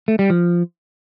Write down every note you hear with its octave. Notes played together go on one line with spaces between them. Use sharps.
A3
G3
F3